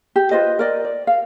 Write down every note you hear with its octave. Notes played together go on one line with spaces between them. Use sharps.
G4
F4 B4 C5 D#5
A#4 D5 D#5
D5
F5